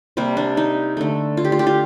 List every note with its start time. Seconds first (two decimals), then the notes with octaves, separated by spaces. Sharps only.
0.17 C3 G3 A#3
0.37 D4
0.57 D#4
0.97 D3 A3
1.37 F4
1.45 G4
1.52 F4
1.59 G4
1.67 F4